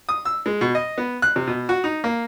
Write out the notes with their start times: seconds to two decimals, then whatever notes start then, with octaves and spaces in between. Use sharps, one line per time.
0.09 D#6
0.25 E6
0.46 G#3
0.61 B2
0.75 D#5
0.98 B3
1.22 F#6
1.36 C3
1.47 B2
1.69 F#4
1.84 D#4
2.04 A#3